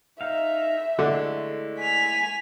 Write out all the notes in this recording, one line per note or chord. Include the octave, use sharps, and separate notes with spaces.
D#4 E5 F5
D3 G#3 A3 E4
G#5 B6 F7